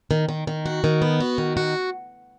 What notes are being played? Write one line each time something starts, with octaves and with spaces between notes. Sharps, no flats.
D#3
D#3
D#3
F#4
D#3
B3
F#4
D#3
F#4